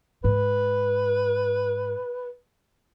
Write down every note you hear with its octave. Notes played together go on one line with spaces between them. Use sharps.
G#2 B4